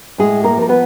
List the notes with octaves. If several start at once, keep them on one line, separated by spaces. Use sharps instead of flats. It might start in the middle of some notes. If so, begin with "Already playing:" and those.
A2 G#3 G#4
A#3 A#4
F3 A#4
B3 B4